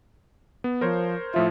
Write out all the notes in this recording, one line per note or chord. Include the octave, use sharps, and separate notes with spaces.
B3
F3 A#4 C5 C#5
A2 F3 F4 E5